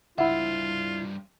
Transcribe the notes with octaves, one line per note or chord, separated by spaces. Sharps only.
C#2 G2 E4 F4 C5 E5 F#5